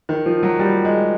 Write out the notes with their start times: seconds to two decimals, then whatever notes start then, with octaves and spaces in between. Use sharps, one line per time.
0.09 D#3
0.26 F3
0.43 F#3
0.59 G3
0.85 G#3